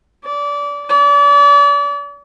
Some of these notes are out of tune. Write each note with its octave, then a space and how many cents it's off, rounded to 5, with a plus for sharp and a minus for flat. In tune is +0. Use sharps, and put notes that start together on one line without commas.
D5 -25
D5 -40